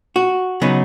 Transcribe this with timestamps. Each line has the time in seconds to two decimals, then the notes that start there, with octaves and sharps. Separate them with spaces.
0.16 F#4
0.61 C#3 F#3 B3 D#4